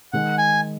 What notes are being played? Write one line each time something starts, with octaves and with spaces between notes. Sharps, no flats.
D#3 G#3 D#4 F#5
G#5